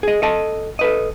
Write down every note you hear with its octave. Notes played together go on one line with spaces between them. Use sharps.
G#4 D#5
A4 D#5 A5
A4 B4 D#5